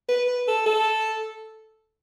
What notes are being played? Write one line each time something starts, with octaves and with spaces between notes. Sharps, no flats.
B4
B4
A4
A4